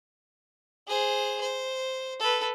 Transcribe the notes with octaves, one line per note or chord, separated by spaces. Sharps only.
G#4 C5
C5
A4 B4